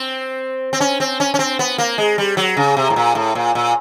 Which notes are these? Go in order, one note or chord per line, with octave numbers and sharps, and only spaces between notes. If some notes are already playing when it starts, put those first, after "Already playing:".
Already playing: C4
C4
C#4
C4
C#4
C#4
C4
B3
A#3
G#3
G3
F#3
C#3
C3
A2
A#2
A2
A#2
A#2